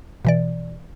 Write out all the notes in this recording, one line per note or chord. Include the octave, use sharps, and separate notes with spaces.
B2 E3 D5